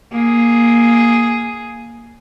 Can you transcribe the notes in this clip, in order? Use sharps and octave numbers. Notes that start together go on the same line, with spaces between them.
A#3 G#4